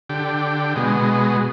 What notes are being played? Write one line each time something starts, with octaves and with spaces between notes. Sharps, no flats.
D3 G4
B2 G#3